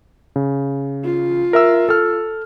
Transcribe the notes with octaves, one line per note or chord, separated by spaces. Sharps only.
C#3
F4
A#4 E5 E6
A4 F6